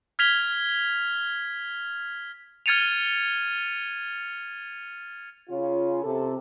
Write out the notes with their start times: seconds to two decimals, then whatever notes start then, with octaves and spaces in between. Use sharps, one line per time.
0.19 F6 G#6 B6 F7 G7
2.66 F6 G#6 A6 C#7 D#7 F7
5.50 C#3 C#4 F4
6.04 C3 A4